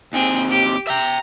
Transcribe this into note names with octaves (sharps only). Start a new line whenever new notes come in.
D#2 C4 G#4 G5
G4 D6
E5 G5 A#5